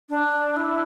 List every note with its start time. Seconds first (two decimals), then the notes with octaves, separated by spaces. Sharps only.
0.09 D4
0.56 E4